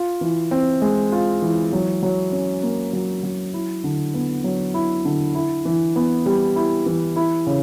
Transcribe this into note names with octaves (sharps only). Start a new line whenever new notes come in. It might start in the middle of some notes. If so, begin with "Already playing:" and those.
Already playing: F4
E3
C4
G#3
F4
E3
F#3
F#3
C#4
A#3
F#3
F#3
E4
D3
B3
F#3
E4
D3
E4
E3
B3
G3
E4
E3
E4
C#3